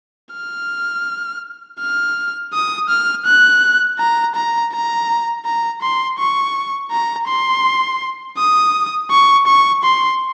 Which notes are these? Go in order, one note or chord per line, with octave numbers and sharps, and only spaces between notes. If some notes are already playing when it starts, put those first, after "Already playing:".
F6
F6
D#6
F6
F#6
A#5
A#5
A#5
A#5
C6
C#6
A#5
C6
D#6
C#6
C#6
C6